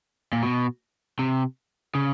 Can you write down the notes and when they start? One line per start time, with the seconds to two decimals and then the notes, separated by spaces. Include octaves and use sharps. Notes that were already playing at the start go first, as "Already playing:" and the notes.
0.33 A#2
0.43 B2
1.19 C3
1.95 C#3